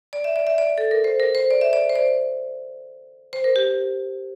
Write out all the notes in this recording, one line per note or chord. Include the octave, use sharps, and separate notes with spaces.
D5
E5
D5
E5
D5
A4
A#4
C5
A#4
C5
D5
E5
D5
C5
D5
C5
A#4
G4